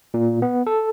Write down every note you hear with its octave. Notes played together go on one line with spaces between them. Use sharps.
A#2
B3
A4